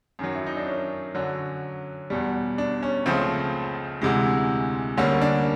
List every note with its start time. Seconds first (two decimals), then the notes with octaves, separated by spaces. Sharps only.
0.19 F#2 D#3 F#3
0.35 E4
0.46 D#4
0.57 D4
0.67 C#4
1.15 F#2 D3 F#3
2.10 E2 B2 G3
2.58 D4
2.83 C#4
3.06 C#2 C#3 F3 A3 C4
4.01 D2 C3 E3 G#3
4.97 D2 D3 G3 A#3 C#4
5.21 D4